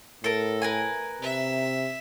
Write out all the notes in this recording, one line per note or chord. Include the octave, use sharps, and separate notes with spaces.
A2 A4 A#4
A#4 B4 G#5
C3 E5